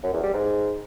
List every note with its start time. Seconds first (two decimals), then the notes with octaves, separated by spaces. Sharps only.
0.03 F#2
0.13 E2
0.23 G3
0.33 G#2